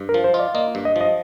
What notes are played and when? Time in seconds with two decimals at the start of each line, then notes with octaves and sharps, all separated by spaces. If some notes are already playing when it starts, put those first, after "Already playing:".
Already playing: G2
0.09 A#4
0.14 F3
0.24 C5
0.34 F4 D#5
0.39 D5
0.54 A#3 D#5
0.75 G2
0.85 D#5
0.96 F3 D#5